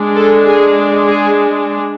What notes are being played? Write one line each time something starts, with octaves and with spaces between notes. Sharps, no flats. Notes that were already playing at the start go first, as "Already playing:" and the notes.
Already playing: G#3 D4
A4
G#4
G#4